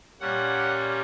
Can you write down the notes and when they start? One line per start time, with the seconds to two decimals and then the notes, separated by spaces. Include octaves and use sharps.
0.20 A#2 G3 C#4 F#5